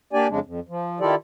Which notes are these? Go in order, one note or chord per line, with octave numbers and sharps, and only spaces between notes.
A#3 D4 G4 D5 G#5
F2 C#3 G#3 D4
F2
F3
D#3 E4 F4 G4 A4 D5